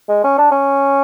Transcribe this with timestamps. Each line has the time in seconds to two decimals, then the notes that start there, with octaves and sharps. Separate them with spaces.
0.09 G#3
0.24 C#4
0.38 D4
0.51 C#4